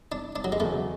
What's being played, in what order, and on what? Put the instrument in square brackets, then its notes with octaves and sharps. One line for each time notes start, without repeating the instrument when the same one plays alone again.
[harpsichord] D4
D4
F#3
G#3
[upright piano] E2 C#3 F#3 [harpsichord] A3